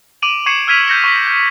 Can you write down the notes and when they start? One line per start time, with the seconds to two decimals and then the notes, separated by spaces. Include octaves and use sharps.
0.22 D6 D7 D#7 F7 F#7
0.46 C#6 G#6 C7 C#7 D#7 E7
0.67 E6 F6 G#6 B6 D#7 F7
0.88 G6 A#6 C#7
1.04 C#6 B6
1.27 G6